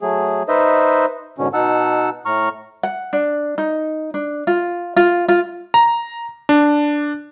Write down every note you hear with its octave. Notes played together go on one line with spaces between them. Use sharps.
F#3 A3 G#4
D#4 B4 C5 D#5 E5
G#2 B2 D3 C#4
B2 D#4 F#5 A5 E6
A2 A#5 C#6 F6
F#5
D4
D#4
D4
F4
F4
F4
A#5
D4